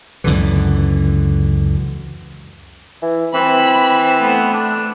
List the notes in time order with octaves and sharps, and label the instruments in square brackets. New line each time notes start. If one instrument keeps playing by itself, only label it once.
[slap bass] C#2 F#2 D3 E3
[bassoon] E3
[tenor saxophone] E3 [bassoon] C4 [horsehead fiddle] B5
[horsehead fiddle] A3 [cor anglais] B3
[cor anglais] D4